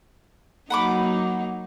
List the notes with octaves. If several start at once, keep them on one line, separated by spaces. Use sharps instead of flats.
F#3 A#3 D#4 F#5 B5 D6